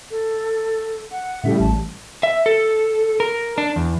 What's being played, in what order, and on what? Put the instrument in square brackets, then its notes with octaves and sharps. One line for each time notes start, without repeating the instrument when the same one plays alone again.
[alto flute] A4
F#5
[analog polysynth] A2 C#3 G3 [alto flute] E5
[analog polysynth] A1 [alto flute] A5
[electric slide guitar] E5
A4
A#4
D4
E2